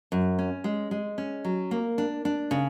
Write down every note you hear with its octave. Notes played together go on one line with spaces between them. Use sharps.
F#2
C#4
G#3
G#3
C#4
F#3
A#3
D4
D4
C#3